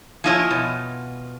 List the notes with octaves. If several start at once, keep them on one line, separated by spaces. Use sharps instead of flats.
F3 E4 F4 C#5 D#5 G#5
B2